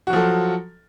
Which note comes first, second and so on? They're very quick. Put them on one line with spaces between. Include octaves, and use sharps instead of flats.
F#4 F#3 F3 A4